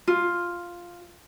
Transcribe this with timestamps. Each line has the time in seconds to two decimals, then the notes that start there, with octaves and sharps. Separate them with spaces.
0.07 F4